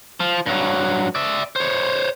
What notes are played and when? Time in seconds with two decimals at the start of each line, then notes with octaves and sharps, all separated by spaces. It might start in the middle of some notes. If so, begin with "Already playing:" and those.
0.20 F3
0.46 G2 F#3
1.15 D5 E5
1.56 C5 C#5